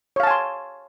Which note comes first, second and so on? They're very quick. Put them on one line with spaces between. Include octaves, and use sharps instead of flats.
C#5 F5 A5 G#5 C6